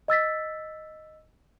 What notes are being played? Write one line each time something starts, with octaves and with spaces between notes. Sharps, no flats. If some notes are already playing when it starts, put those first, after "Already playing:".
D#5 E6 A6 B6